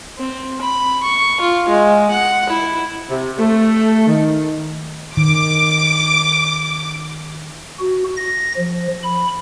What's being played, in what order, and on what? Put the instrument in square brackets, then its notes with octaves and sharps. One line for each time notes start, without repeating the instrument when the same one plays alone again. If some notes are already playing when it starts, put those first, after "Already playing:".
[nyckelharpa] C4
B5
C#6
F4
G#3
F#5
E4
[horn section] C3
A3
D#3
[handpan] D#3 [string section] D6
[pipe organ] F#4
A#6
F3
B5